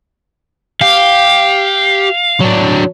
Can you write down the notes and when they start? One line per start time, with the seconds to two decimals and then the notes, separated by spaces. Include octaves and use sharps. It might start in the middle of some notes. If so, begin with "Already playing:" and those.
0.81 G4 F5
2.40 F#3 D4